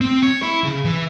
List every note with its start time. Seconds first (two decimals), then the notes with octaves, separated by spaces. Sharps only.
0.01 C4
0.23 C#5
0.42 E4
0.64 C#3
0.85 E3